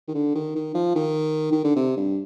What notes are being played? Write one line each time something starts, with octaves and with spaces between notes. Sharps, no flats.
D#3
D3
D#3
D#3
F3
D#3
D#3
D3
C3
G2